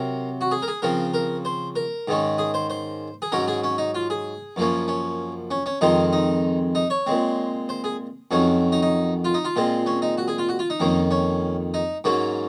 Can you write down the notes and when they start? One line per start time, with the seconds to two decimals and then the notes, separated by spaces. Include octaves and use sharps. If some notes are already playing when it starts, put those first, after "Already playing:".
Already playing: C3 F#3 C4 A#4
0.41 F#4
0.51 G#4
0.62 A#4
0.68 G#4
0.82 C#3 F3 C4 A#4
1.14 A#4
1.45 C5
1.76 A#4
2.08 G#2 D#3 G#3 C#4
2.38 G#4
2.54 C5
2.70 C5
3.22 G#4
3.32 G#2 F#3 C#4 A#4
3.48 G#4
3.64 C#4
3.78 D#4
3.95 F4
4.10 G#4
4.56 F#2 F3 A#3 C#4
4.88 C#4
5.51 C#4
5.66 C#4
5.81 F2 D#3 G#3 C4 D#4
6.13 D#4
6.75 D#4
6.90 C#5
7.06 A#2 G#3 C4
7.69 C5
7.84 G#4
8.31 F2 D#3 F#3 C#4
8.72 D#4
8.82 D#4
9.25 F4
9.34 D#4
9.45 F4
9.56 A#2 G#3 C4
9.86 C#4
10.02 D#4
10.18 F#4
10.28 G#4
10.38 F4
10.49 F#4
10.59 F4
10.70 D#4
10.80 F2 D#3 A#3 C#4
11.11 C#4
11.74 D#4
12.04 G#2 F#3 A#3 C#4